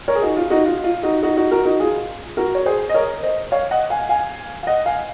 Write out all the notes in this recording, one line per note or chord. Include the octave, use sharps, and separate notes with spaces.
A#4 C#5
G#4
D#4 F#4
F4
D#4 F#4
F4
F4
D#4 F#4
D#4 F#4
D#4 F#4
F#4 A#4
D#4 F#4
F4 G#4
F#4 A#4
C#5
G#4 C5
D#5
A#4 C#5
C5 D#5
C#5 F5
D#5 F#5
F5 G#5
F5 G#5
F5
D#5 F#5
F5 G#5